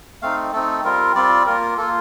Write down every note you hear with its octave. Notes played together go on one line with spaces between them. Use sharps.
A3 C4 D#4 F5
A3 C4 D#4 A4
G3 C4 F4 A#4
G3 C4 F4 D5
A#3 F4 A#4
A#3 F4 A4